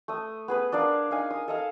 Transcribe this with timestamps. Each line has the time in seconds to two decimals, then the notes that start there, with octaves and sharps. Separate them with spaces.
0.08 A3 D#6
0.48 B3 G#4 B4
0.72 D4 A#4 D5 F5
1.11 D#4 F5 G#5
1.31 D#6
1.48 A4 D#5 F5